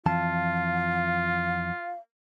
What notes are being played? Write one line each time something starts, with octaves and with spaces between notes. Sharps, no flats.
F2 E3 F4 F5 A5